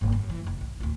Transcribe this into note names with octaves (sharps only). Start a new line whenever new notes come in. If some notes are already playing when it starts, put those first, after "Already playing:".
G1 A#2
F#2
E3
F1 D#4
B1
D1 F4